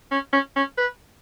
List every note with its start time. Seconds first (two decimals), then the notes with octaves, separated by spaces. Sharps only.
0.11 C#4
0.33 C#4
0.56 C#4
0.78 B4